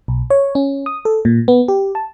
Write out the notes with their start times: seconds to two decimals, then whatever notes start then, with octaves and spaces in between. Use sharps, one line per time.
0.08 B1
0.30 C#5
0.55 C#4
0.86 D#6
1.05 A4
1.25 A#2
1.48 B3
1.68 G4
1.95 A5